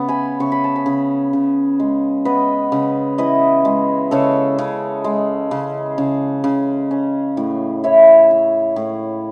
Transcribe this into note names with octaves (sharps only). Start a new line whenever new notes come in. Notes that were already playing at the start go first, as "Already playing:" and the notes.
Already playing: C#3 B3
G#5 B5
C#3 C#6
B5
A5
G#5 B5
C#3
C#3
G#3
B3 B4 D#5
C#3
E3 B4 D#5
G#3
C#3 A4 C#5
C#3
G#3
C#3
C#3
C#3
C#4
A2
E4 C#5 E5
E4
A2